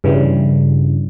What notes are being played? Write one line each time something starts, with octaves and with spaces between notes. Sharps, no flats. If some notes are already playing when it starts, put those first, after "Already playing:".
G2 C#3 E3 G3